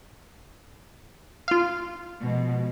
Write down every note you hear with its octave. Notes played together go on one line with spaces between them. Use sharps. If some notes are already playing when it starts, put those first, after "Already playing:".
F4 F5
B2 F3 G#3